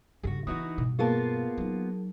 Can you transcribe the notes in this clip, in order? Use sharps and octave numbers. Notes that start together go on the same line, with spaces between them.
G2 C#3 F#4 G#4
E3 B3 D#4 F4 F#4 D#6
G2 B2
A#3 B3 F4 G#4 A#4 A5
F#3 D#4